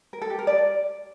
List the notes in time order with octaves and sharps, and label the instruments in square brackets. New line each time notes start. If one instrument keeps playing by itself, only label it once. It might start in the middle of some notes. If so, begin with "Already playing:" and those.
[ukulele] A#4
A4
G4
A#4
D5